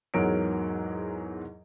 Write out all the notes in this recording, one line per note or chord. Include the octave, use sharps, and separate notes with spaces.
E2 G#2 F#3 A#4 C#5 D7